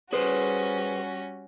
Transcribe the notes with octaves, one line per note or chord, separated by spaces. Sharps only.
G3 C#4 F#4 G#4 B4 C5